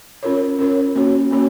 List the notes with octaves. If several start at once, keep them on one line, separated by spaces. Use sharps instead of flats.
C#4 F4 A#4 C#5
C#4 F4 A#4 C#5
A#3 C#4 F#4 C#5
A#3 C#4 F#4 C#5